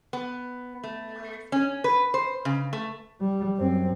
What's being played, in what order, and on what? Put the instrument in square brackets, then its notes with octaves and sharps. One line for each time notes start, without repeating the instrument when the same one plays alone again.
[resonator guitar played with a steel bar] B3
A3
C#4
B4
C5
C#3
A3
[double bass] G3
F#2 C4